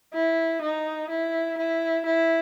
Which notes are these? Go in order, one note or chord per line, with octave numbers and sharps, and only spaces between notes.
E4
D#4
E4
E4
E4